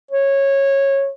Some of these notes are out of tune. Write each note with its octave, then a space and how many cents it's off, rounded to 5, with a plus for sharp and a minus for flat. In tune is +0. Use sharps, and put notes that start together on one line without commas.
C#5 -15